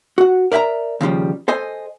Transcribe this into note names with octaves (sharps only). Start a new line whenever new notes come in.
F#4 F#5
A#4 D5 E5 G5 A#5
D#2 C#3 F3 G3
A4 C5 D#5 G#5